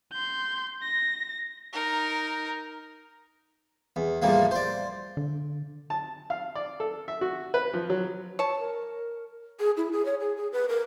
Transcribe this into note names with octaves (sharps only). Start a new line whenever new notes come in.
C6 G6
A#6
D#4 A#4
E2
E2 A2 F3 G3 A#3
C5 D5
D3
A5
F5
D5
A4
E5
F#4
B4
F3
F#3
C#5 A5
A#4
G#4
E4
G#4
C#5
G#4
G#4
B4
A#4